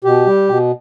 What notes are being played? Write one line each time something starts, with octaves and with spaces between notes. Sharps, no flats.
B2 G4
G3
B2